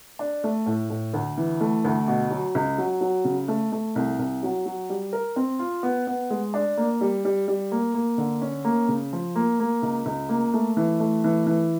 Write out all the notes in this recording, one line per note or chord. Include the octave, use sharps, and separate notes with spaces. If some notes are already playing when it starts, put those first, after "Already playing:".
D4
A3
A2
A2
D2
E3
A3
D2
B2
F#3
C#2
F#3
F#3
C#3
A3
A3
C2
C2
F#3
F#3
G3
A#4
C4
F4
B3
B3
G#3
D4
A#3
G3
G3
G3
A#3
A#3
D3
C#4
A#3
C#3
F3
A#3
A#3
C#2
C#2
A#3
A3
E3
A3
E3
E3